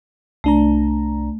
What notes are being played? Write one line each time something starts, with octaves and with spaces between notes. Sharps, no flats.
C2 A3 D4 A#5